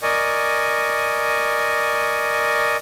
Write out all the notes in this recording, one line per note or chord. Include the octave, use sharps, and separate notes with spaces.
A#4 D5 D#5 G#5 C#6